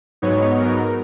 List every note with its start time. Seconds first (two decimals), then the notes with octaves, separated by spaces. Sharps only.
0.22 G#2 F#3 B3 D#4 C#5
0.59 A#4